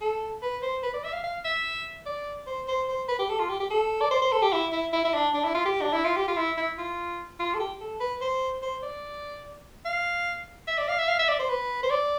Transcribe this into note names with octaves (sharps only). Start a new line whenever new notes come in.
A4
B4
C5
B4
D5
E5
F5
F5
E5
D5
C5
C5
C5
B4
G4
A4
F4
G4
G4
A4
D5
C5
C5
A4
G4
E4
E4
E4
E4
D4
D4
E4
F4
G4
D4
E4
F4
G4
F4
E4
E4
F4
F4
A4
G4
A4
B4
C5
C5
D5
F5
E5
D5
F5
E5
F5
E5
D5
C5
B4
C5
D5